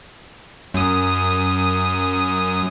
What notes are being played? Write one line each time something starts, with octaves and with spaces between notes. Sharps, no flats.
F#2 D#6